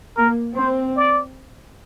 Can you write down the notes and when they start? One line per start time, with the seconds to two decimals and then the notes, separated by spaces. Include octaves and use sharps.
0.17 A#3 A#4
0.56 C4 C5
0.97 D5